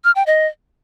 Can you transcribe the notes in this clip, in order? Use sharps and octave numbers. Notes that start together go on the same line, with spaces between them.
F6
G5
D#5